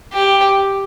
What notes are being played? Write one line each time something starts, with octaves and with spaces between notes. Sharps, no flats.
G4